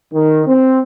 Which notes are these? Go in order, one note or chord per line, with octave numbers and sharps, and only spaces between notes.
D#3
C4